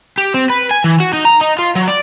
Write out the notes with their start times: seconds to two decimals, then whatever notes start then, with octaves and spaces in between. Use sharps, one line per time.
0.18 G4
0.34 C4
0.50 B4
0.71 G#5
0.84 E3
1.00 F#4
1.13 D#4
1.25 A#5
1.41 D#4
1.59 F4
1.75 F#3
1.88 D5